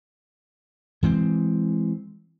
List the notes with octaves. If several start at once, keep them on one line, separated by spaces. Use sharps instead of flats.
E3 G#3 C4